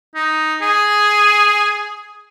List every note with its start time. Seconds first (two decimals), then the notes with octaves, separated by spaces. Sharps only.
0.15 D#4
0.62 G#4